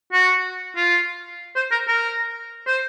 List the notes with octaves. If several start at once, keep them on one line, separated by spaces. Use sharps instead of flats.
F#4
F4
C5
A#4
A#4
C5